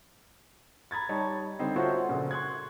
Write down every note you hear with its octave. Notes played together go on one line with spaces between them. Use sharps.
A#5 B5 G#6 A6
G3 D#4 C#5 A5
D3 G3 C4 D#4
F4 F#4 A4 C5 C#5 E5
A#1 A#2 C#3 A3
C6 C#6 F#6 G#6